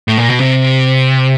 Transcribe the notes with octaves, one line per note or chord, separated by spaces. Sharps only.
A2
A#2
B2
C3